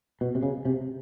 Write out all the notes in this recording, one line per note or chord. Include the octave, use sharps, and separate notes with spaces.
B2
C3
C#3
C3